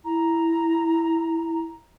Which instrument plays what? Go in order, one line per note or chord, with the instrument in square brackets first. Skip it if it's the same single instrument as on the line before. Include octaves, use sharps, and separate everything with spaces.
[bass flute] E4 [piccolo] A#5